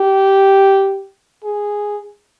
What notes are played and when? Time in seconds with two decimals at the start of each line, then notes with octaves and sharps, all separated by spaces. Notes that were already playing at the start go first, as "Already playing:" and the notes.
Already playing: G4
1.44 G#4